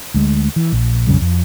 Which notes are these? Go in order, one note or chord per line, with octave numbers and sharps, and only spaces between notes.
D2 G#3
E3
A#1
B1 F2 C#3 G3
F2